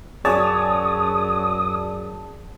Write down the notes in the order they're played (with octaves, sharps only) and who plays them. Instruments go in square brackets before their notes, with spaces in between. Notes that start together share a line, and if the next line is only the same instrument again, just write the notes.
[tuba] F#2 [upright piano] C#4 F#4 C#5 [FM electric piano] G#4 D5 A5 [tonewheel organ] D#6